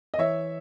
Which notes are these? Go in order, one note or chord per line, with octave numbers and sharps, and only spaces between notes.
D#5
E3 C#5 E5